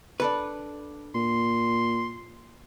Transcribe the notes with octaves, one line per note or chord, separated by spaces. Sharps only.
D4 A4 B4
A#2 C6